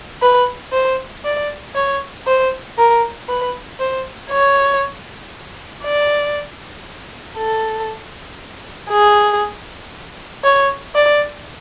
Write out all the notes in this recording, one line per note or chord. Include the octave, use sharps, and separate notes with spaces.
B4
C5
D5
C#5
C5
A#4
B4
C5
C#5
D5
A4
G#4
C#5
D5